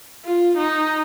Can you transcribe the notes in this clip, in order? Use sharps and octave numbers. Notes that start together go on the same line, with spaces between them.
F4
D#4